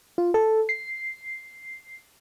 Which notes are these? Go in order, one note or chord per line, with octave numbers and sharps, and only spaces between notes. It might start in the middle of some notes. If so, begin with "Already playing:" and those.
F4
A4
C7